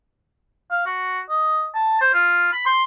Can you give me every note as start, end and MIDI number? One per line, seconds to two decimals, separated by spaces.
0.71 0.82 77
0.86 1.20 66
1.29 1.67 75
1.75 2.00 81
2.01 2.10 72
2.14 2.50 65
2.53 2.64 83
2.66 2.84 84